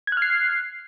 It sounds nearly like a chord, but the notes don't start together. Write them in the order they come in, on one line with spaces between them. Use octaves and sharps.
G#6 F#6 F6 C7